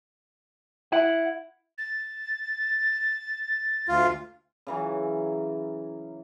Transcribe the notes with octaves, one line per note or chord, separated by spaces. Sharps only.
E4 F#5
A6
D2 F4
C#3 E3 F#3